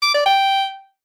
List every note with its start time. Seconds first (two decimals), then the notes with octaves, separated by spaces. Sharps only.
0.02 D6
0.14 D5
0.26 G5